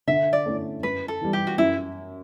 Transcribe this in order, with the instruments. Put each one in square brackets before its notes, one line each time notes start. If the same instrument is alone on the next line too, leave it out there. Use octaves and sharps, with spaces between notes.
[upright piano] D3 [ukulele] E5
[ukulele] D5
[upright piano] A3 C#4 E4
[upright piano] F#2 [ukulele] B4
[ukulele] A4
[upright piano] E3 G3
[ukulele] G4
F#4
[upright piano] F#2 [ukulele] E4